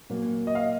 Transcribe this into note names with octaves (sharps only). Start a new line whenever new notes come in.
A#2 F#3 A#3
D#5
F5